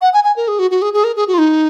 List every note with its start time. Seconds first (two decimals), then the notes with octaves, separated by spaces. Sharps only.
0.02 F#5
0.14 G#5
0.24 G#5
0.36 A#4
0.48 G#4
0.59 F#4
0.71 F#4
0.82 G#4
0.94 G#4
1.04 A#4
1.16 G#4
1.28 F#4
1.34 F4
1.38 D#4